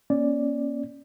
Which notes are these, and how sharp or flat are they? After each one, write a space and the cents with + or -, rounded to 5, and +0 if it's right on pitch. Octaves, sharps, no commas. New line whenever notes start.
A#3 +40 C#4 +0 D5 +0